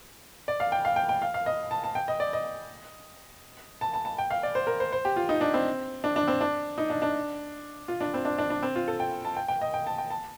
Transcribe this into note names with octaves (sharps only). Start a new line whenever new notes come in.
D5
F5
G5
F5
G5
G5
F5
F5
D#5
A5
A5
G5
D#5
D5
D#5
A5
A5
A5
G5
F5
D5
C5
A#4
C5
C5
G4
F4
D#4
D4
C4
D4
D4
C4
D4
D#4
D4
D4
F4
D4
C4
D4
D4
D4
C4
F4
A4
G5
A5
G5
G5
D#5
G5
A5
G5
A5